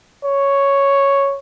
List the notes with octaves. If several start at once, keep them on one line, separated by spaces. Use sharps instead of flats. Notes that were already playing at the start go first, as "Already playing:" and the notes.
C#5